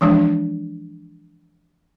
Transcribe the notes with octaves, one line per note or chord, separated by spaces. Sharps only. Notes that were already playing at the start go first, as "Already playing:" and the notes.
E3 F3 G#3 D4